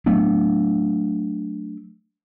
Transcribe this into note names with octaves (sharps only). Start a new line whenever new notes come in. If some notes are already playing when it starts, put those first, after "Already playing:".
F#3 A3 B3 D4